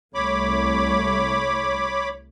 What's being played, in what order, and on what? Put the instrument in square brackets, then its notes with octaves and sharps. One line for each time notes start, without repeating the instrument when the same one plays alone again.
[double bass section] C2 A3 [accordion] C#5 B5 D6